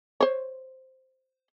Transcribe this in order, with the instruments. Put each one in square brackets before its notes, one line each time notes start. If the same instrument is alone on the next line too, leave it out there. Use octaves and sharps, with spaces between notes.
[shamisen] C5 C#5